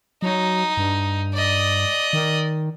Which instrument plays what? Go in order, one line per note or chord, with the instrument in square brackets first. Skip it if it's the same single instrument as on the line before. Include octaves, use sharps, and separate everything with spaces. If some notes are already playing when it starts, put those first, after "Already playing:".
[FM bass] F#3 [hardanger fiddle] D#4
[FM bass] G2
[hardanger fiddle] D5 D#5
[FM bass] D#3